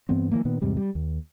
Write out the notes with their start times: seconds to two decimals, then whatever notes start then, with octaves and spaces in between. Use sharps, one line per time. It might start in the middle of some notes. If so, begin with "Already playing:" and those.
0.09 G2 E3 B3 C4
0.31 E3 F3 A3 A#3
0.45 A#2 D#3 B3
0.62 E2 G#2 C3 G3
0.77 G3
0.95 D#2